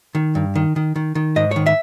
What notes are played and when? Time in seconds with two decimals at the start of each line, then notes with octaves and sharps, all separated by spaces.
0.15 D#3
0.35 G2
0.55 D#3
0.76 D#3
0.96 D#3
1.15 D#3
1.36 G#2 D#5
1.51 D#3 C#5
1.66 E5